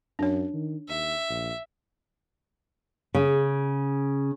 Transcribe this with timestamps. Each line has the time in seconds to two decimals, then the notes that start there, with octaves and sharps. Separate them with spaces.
0.19 F#2 D4 C#5
0.54 D#3
0.89 D#2 E5
1.29 A#1
3.14 C#3